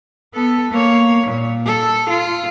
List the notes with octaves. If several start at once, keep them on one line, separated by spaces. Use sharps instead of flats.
B3 A4
A#3 C#5
A#2
A4
F4